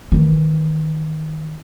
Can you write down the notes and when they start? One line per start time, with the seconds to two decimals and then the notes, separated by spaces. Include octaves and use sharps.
0.12 D#3 E3